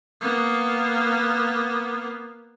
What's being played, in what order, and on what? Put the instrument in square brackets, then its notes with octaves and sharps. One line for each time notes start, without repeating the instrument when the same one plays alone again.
[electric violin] A#3 B3